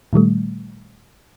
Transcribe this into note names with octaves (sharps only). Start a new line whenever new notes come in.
A#2 D#3 G3 A3